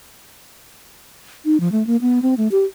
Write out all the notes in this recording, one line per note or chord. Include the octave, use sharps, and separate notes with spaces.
D#4
F3
A3
A#3
B3
C4
A3
G4